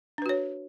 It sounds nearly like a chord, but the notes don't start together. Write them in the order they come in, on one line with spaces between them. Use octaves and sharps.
D4 B4 F#4 C#5